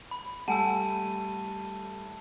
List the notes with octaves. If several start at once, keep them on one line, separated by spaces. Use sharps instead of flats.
B5
G3 A3 F#5 G#5 A5 E6 D#7